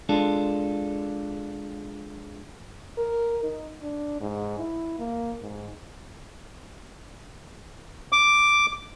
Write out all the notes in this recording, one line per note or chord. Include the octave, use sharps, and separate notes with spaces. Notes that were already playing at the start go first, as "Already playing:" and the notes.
G#3 D4 F4 A4
A#4
D#4
D4
G#2
E4
A#3
G#2
D6